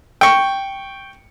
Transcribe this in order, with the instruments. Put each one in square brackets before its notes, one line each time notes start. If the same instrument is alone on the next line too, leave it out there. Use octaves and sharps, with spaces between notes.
[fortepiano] G5 C#6